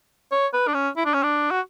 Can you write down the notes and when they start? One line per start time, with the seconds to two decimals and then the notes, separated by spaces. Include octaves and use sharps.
0.32 C#5
0.54 B4
0.68 D4
0.74 C#4
0.97 E4
1.06 D4
1.14 C#4
1.23 D4
1.51 F#4